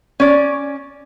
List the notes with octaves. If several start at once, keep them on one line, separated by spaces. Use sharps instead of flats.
C#4 D5